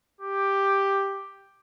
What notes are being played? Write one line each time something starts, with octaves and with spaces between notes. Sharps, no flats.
G4